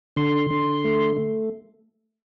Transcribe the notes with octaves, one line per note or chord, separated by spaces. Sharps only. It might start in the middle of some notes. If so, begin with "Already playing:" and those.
D3 C6
D3
A3
A3